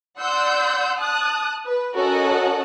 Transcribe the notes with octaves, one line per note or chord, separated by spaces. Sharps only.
D5 F#5 C6 E6 G6
A5 D#6 F#6
B4
C#4 F#4 A4 A#4 D#5 F#5